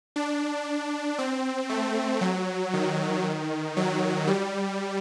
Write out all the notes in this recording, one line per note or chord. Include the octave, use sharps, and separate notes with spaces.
D4
C4
A3
F#3
D#3
F#3
G3